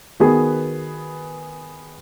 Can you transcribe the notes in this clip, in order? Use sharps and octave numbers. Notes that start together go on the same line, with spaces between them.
D#3 B3 F#4 G#4 B4